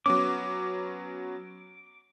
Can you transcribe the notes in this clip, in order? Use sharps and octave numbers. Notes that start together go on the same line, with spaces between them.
F#3 B3 C#4 D6